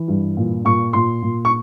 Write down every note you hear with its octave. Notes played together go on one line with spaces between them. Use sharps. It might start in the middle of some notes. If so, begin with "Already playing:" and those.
Already playing: E3
G2
A#2
A#2 C#6
A#2 C6
A#2
C#6